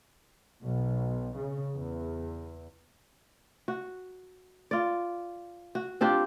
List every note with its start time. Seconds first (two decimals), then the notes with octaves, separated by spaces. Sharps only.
0.64 B1
1.36 C#3
1.75 E2
3.68 F#4
4.71 F4 D5
5.75 F#4
6.01 C4 D4 F4 G4